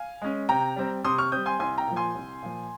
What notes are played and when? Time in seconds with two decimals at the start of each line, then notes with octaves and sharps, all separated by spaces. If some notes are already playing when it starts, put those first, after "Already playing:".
Already playing: F5 G#5
0.22 G#3 C#4
0.49 C3 G5 A#5
0.76 G3 C4
1.04 C3 C6 D#6
1.18 C#6 F6
1.32 G3 C4 D#6 G6
1.46 G#5 C6
1.59 C2 G#5 C6
1.78 G5 A#5
1.87 A#2 F3
1.96 G#5 C6
2.14 C2
2.43 A#2 F3